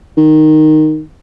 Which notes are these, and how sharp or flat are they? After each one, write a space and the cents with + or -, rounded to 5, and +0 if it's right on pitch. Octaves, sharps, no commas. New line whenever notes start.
D#3 -5